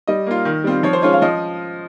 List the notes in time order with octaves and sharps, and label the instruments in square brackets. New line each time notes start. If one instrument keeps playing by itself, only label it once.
[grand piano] G3 D#5
A#3 F4
D#3
G3 C4 F4
F3 C#5
C5
G#3 C#4 F4 C#5
F5
F3 D#5